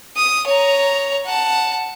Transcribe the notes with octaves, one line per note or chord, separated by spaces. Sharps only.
D#6
C#5 A#5
F#5 A5